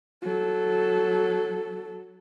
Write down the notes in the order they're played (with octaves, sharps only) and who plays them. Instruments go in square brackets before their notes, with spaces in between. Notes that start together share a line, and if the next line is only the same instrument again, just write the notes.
[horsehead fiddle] F#3 A4